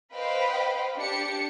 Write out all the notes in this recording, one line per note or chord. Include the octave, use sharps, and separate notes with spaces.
B4 C5 D#5 F5 G5 B5
D4 G4 C#7